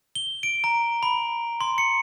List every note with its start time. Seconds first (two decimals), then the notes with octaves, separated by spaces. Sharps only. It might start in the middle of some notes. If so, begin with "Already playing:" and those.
0.15 G7
0.43 D7
0.64 A#5
1.03 B5
1.61 C6
1.78 C#7